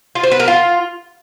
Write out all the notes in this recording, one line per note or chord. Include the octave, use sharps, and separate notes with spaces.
F4
C5
B4
A#4
F4